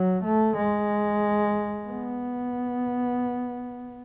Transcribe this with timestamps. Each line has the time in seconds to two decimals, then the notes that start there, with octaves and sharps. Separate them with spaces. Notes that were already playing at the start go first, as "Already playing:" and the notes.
Already playing: F#3
0.24 A3
0.57 G#3
1.88 B3